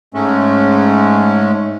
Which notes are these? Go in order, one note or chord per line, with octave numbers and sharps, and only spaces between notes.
G#2 G#3 A3 C#4